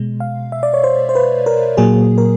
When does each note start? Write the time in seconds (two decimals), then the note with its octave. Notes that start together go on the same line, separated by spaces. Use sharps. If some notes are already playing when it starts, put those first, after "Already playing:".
Already playing: B2 G#3
0.20 F5
0.52 E5
0.63 D5
0.74 C#5
0.84 C5
1.09 C5
1.15 B4
1.46 A#4
1.77 A#2 F#3 A#3 G#4
2.18 A#4